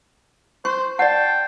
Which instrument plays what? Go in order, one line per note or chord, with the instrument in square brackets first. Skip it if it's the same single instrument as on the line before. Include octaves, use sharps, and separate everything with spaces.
[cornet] C5 [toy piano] C#6
[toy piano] D5 F#5 [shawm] G5 [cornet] A5